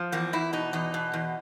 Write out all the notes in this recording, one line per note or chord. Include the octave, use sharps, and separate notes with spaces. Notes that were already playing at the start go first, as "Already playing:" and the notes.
Already playing: F3
E2 A#3
E2 E4
B2 D#4
E2 D#4
B2
E2